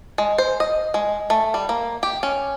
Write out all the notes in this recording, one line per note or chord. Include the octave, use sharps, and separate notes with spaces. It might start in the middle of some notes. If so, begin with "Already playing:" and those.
G#3
C5
D#5
G#3
A3
G3
A#3
G4
C#4